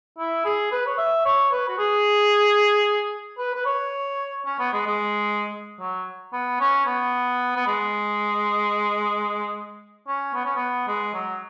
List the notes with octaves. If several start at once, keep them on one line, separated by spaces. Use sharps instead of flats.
E4
G#4
B4
C#5
E5
C#5
B4
F#4
G#4
B4
B4
C#5
C#4
B3
G#3
G#3
F#3
B3
C#4
B3
B3
G#3
C#4
B3
C#4
B3
G#3
F#3